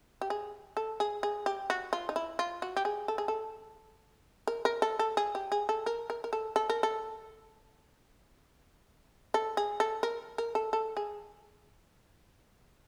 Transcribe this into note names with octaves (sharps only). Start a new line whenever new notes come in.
G4
G#4
A4
G#4
G#4
G4
F#4
F4
D#4
E4
F4
F#4
G4
G#4
A4
G#4
A4
A#4
A#4
A4
A4
G#4
G4
G#4
A4
A#4
A#4
A#4
A4
A4
A#4
A4
A4
G#4
A4
A#4
A#4
A4
A4
G#4